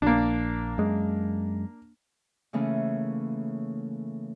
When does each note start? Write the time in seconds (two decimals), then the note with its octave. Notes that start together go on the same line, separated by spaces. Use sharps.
0.02 A#1 A#3 D4
0.78 F#2 G#3
2.53 C#3 E3 A3 A#3 C#4